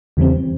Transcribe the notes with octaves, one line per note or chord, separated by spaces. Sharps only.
E2 C#3 E3 G3 C4